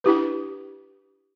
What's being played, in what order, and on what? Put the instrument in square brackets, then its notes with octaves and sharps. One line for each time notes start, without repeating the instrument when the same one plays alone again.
[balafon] D4 E4 G4 B4